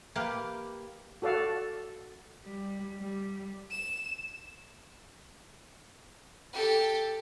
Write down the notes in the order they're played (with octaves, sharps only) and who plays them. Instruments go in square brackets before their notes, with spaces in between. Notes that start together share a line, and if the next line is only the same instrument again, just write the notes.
[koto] A#3 G4 B4
[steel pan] F#4 A4 D5 F5
[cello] G3
G3
[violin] E7
[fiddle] G4 A4